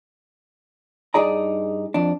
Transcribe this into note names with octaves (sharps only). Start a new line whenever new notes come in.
G2 D#4 G#4 D5 A#5
F2 D4